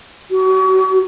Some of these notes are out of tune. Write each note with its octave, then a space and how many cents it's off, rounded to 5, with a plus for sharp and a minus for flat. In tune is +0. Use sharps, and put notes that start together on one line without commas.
F#4 +35